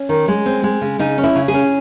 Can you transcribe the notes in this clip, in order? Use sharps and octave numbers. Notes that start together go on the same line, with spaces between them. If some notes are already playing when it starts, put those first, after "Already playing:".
Already playing: C#4
D#3
G#3
C4
G#3
C#3
C#3 D#4
C#4
E4
C#3
G#4
C#4